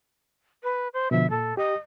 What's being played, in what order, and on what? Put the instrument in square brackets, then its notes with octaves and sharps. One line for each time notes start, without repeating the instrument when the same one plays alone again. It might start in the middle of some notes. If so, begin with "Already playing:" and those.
[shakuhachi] B4
C5
[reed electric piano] B2 D3 F3 [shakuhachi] E5
[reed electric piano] A#2 [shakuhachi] A4
[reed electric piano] G4 [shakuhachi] D#5